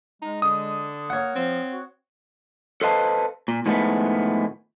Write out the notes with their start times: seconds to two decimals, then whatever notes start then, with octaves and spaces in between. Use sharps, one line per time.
0.22 G#3 D#4
0.42 D3 D#6
1.10 A#3 C#5 F#5
1.36 F3 C4
1.72 F#4
2.81 A4 B4 C5 D#5 F5 A5
3.48 A#2
3.66 A2 D#3 F3 G#3 A3 B3